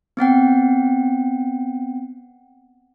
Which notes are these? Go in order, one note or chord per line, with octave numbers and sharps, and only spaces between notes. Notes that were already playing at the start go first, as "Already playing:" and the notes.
B3 C4 F#5 G5